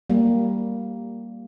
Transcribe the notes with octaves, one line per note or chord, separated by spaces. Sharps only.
G3 A#3